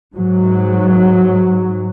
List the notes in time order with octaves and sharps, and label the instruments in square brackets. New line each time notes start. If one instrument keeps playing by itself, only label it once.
[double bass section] G#2 F#3